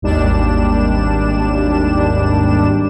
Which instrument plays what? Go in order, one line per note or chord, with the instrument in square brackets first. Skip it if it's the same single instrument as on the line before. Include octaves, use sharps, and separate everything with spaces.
[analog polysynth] G#1 D#2 G3 D4 E7